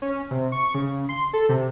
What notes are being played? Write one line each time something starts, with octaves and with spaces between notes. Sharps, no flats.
C#4
C3
C#6
C#3
C6
A4
C3